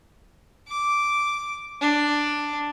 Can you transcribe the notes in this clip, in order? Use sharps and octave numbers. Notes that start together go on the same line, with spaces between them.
D6
D4